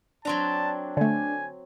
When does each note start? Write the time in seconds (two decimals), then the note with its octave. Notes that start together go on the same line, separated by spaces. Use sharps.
0.25 F#3 C4 D4 A5 A#5
0.97 D3 A3 G#5